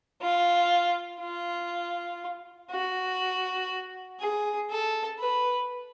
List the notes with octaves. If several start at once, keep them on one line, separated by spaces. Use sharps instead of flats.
F4
F4
F#4
G#4
A4
B4